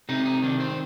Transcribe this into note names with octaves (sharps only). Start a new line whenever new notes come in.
C3 D#4
D#4
D#3 D4
C4